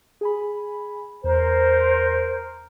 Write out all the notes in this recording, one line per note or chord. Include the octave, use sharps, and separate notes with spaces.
G#4 G#5 B5
E2 A#4 C5